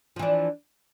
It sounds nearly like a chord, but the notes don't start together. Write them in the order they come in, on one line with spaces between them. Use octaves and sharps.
F3 E3 D4